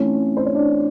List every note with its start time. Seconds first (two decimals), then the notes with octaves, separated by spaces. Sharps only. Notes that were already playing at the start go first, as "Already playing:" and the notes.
Already playing: E3 A3 C4 C#4 D#4 C#5
0.37 C5
0.46 C#5
0.55 D4 D5